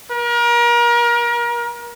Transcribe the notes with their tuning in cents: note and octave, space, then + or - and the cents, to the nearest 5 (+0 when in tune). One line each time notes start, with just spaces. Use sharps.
A#4 +35